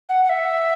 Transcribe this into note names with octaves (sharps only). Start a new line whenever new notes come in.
F#5
F#5
E5